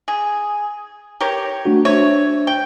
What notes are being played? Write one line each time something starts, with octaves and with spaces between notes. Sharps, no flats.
G#4
G4 A#4 C#5
A3 D4 F#4
D4 C5 C#5 E5
G5